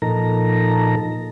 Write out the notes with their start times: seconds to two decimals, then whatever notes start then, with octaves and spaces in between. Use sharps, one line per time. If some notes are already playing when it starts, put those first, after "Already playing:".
0.02 A#2 F3 D#4 A4 A#4 A#5